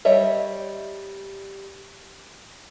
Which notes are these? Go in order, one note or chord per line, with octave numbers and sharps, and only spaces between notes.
G3 C#5 D#5 E5